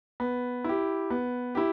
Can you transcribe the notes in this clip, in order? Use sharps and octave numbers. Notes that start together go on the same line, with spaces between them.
B3
E4 G4
B3
E4 G4